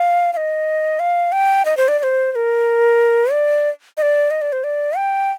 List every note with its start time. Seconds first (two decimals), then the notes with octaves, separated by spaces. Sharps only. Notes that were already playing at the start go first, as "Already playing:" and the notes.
Already playing: F5
0.33 F5
0.37 D#5
0.99 F5
1.32 G5
1.65 D#5
1.77 C5
1.88 D5
1.99 D5
2.03 C5
2.32 C5
2.35 A#4
3.31 D5
3.97 D#5
4.02 D5
4.31 D#5
4.41 D5
4.52 C5
4.64 D5
4.97 G5